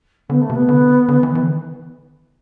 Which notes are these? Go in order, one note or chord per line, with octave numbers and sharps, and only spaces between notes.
D3 B3
A3
C3
B3
D3
D3
E3
E3
D3